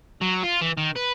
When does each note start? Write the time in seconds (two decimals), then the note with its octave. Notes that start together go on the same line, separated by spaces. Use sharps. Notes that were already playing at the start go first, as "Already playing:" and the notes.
0.22 F#3
0.44 F4
0.62 E3
0.77 D#3
0.96 B4